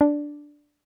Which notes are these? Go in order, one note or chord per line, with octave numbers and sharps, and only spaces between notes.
D4